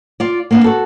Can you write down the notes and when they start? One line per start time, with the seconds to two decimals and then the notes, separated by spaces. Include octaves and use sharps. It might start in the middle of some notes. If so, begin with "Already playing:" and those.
0.20 F4 D5
0.51 A#3 B3 D4
0.64 F#4 A4